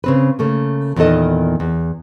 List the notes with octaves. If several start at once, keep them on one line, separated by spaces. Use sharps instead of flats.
C#3 C4 B4
C#3 A3 A#3
E2 A#2 D#3 B3 A4 D#5
E2